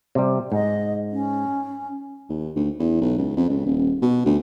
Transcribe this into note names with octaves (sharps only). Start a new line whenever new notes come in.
C3 G3
G#2 D#5
C#4
D#2
D2
E2
B1
C#2
F2
C#2
D#1
B2
D2